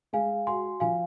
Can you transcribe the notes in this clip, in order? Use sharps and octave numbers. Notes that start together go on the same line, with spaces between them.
G#3 F5 G#5
F#4 G#5 C6
F3 F5 G#5